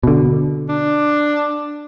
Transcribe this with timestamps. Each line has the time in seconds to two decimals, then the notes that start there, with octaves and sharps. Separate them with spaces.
0.03 B2 D3
0.69 D4